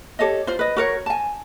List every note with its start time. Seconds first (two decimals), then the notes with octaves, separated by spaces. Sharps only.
0.19 G4 A4 C#5 D#5
0.47 F4 C5
0.59 B4 D#5
0.77 F#4 A#4 C#5
1.06 G#5 A5